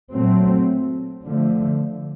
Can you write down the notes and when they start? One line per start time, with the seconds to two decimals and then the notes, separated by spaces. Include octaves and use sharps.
0.12 A#2 F#3 A3 C4
1.26 D3 F3 A3